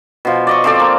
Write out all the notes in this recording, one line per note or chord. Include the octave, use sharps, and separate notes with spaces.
B2 F3
D5 D#5 C#6
F3 C4 A4 D5
A#3